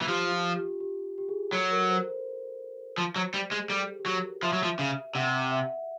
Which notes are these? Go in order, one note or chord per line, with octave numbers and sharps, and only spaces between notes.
E3
F3 G4
F4
G4
G4
G4
G#4
F#3 A4
A#4
C5
C5
F3
F#3 C5
G3 G4
G#3 G#4
G3 A4
G4
G4
F#3 F#4
A#4
F3 E5
F#3
F3
C#3
C3 F#5
E5